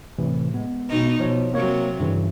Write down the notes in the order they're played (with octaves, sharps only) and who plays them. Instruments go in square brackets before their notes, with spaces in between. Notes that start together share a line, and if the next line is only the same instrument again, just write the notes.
[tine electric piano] A2 C3 E3
G#3 B3
[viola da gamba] B2 D#4
[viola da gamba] B2 [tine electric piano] F3 C#5
[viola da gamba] C3 F#3 [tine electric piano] A#3 C#5
[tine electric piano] G2 C#3 E3